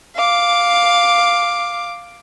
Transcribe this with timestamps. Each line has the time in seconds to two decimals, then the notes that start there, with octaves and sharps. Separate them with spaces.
0.15 F5 D6